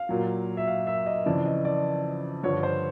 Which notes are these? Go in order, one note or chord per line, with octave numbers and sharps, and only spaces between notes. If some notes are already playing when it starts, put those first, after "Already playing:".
Already playing: F5
A#2 F#3
E5
F5
E5
D#5
F2 C#3 E3 D5
D#5
D5
G2 D3 F3 C#5
C5